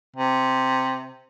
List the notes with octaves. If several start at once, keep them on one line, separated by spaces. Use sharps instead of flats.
C3